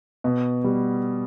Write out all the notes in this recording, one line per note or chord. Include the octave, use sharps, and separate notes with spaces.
B2
G3 B3